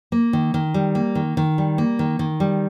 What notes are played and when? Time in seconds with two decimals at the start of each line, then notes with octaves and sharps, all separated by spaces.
0.12 A#3
0.33 D#3
0.54 D#3
0.74 G3
0.95 A#3
1.15 D#3
1.37 D#3
1.58 G3
1.78 A#3
1.99 D#3
2.19 D#3
2.40 G3